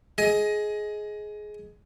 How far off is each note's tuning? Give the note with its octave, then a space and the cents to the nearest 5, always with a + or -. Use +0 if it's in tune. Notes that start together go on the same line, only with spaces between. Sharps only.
G#4 +15 D#5 +15